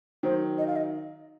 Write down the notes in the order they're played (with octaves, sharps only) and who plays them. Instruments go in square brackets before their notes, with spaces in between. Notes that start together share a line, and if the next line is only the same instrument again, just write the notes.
[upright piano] D#3 F#3 [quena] C5
[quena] D#5
F5
D#5